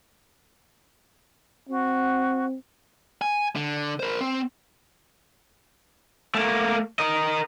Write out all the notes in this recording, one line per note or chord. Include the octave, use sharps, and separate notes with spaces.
C4 F#4
G#5
D3
A#4 C5
C4
A3 A#3
A#4 D#5